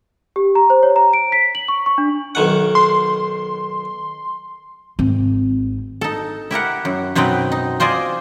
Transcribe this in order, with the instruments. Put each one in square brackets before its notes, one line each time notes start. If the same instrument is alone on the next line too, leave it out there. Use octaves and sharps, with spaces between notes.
[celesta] G4
A#5
C5
C#5
A#5
D7
B6
F#7
C#6
C#6
D4
[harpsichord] B1 D#3 F#5
[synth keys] C6
[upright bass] G#1 C4
[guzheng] D#4 A4
E4 G4 A#4 F#5
F#2
F#2 B2 C4 D#4 B4 G5
D#4
F4 C5 D5 D#5 G#5